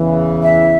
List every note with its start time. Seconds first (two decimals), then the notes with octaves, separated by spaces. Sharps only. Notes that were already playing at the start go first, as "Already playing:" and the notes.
Already playing: E2 C#3 E3
0.43 E5